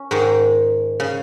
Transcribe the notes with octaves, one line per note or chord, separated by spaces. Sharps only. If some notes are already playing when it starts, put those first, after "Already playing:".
Already playing: C#4
G#2 D#3 G#3
C#3